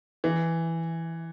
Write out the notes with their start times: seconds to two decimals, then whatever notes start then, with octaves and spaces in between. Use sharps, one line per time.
0.24 E3